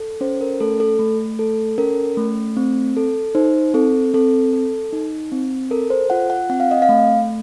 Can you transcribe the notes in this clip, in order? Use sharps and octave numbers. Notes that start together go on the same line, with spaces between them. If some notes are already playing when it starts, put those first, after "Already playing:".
Already playing: A4
C#4 C5
A#4
A3 A4
A4
A3
A4
C#4 A#4
A3
C4
A4
D#4 C5
C4 A4
C4 A4
A4
D#4
C4
A4 A#4
C5
F4 F#5
F#5
C4 F#5
F5
D#5
F5
A3